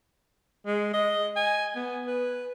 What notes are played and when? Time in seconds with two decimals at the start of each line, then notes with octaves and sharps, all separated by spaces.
0.66 G#3
0.94 D#5
1.36 G#5
1.75 B3
2.07 B4